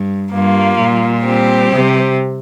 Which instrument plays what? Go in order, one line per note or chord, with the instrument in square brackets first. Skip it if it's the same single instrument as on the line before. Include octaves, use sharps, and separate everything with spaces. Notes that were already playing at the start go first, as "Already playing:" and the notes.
Already playing: [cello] G2
[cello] G2 [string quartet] G3 A#3 F4
[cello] A#2
[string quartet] G3 C4 G4
[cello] C3